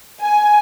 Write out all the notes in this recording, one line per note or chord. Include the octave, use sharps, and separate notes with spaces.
G#5